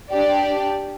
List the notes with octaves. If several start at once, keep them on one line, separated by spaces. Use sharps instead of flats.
D4 G4 D5